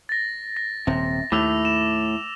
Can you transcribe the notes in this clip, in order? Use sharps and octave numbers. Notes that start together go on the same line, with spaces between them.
A6 A#6
A#6
D#1 C3
D#2 A2 D6 E6 F7
E7